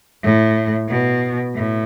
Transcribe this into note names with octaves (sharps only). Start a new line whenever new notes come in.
A2
B2
A2